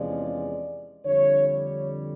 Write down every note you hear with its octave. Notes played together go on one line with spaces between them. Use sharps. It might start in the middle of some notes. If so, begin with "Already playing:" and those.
Already playing: E2 C3 F3 G#3 C#4 D5
F2 D3 G3 C#5
C#5